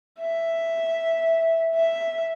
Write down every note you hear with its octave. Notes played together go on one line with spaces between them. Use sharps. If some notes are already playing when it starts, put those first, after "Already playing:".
E5
E5